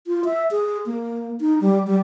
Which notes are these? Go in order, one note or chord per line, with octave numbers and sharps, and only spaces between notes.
F4
E5
G#4
A#3
D#4
G3
G3